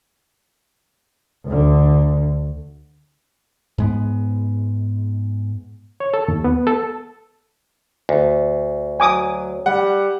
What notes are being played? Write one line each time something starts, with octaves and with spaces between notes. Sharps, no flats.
D2 D3
G#2 G#3 B3
C#5
A4
D#2
B3
A4
D2
F#3 G#5 D6 D#6
G3 F#5